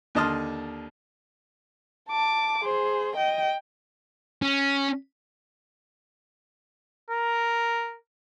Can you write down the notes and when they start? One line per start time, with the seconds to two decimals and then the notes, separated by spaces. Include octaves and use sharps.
0.15 D#2 D3 D#5 A5 C6 F6
2.09 A5 D6
2.64 G#4 C5
3.17 D#5 G5
4.42 C#4
7.10 A#4